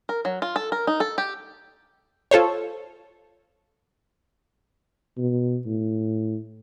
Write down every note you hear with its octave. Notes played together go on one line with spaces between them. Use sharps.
A#4
F#3
F4
A4
A#4
D#4
A4
G4
F4 A4 C5 C#5
B2
A2